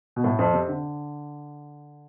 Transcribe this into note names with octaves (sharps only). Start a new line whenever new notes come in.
B2
A2
F2
C3
D3